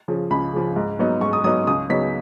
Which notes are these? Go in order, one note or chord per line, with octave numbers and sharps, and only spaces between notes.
C#3 F3
C#2 B5
C#3 F3
G#2
F#3 B3 D#4
G#2 C#6
D#6
F#3 B3 D#4 D#6
C#2 D#6
C#3 F#3 B3 D#4 B6